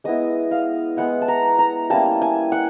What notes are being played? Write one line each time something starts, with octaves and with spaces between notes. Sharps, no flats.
G#3 B3 E4 D#5
F5
G#3 B3 E4 F#5
A5
A#5
A#5
G3 A#3 C#4 E4 A5
G#5
F#5